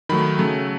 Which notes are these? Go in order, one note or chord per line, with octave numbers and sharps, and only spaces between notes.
D#3 F#3 A3 B5
C#3 F#3 A3